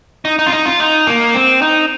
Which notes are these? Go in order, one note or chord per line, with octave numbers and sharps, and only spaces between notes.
D#4
D#4
F4
D#4
F4
D#4
A#3
C4
D#4